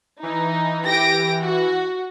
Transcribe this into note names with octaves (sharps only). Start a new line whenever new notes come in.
E3 D#4
G4 A#6 D7
F#4